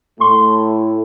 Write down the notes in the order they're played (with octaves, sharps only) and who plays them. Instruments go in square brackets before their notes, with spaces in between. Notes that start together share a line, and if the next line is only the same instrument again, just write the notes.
[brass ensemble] A2 A3 [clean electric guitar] C6